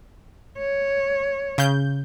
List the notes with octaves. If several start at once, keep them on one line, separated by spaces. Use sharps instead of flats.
C#5
C#3 G6